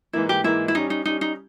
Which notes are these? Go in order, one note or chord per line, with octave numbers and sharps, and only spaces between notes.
G#2 E3 A#3 E4
G4
G#2 E3 A#3 E4
E4
G3 C#4 D#4 G4
D#4
G3 C#4 D#4 G4
D#4